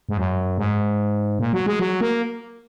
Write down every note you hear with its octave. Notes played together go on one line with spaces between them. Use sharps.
G#2
F#2
G#2
A#2
F#3
G#3
F#3
A#3